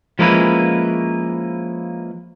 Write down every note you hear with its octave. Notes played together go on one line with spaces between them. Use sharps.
F3 G#3 A#3 C#4 E4 B4